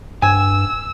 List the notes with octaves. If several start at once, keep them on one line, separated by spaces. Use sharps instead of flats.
G2 G#5 E6